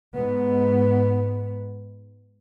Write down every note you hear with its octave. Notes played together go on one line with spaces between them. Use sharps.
G#2 B3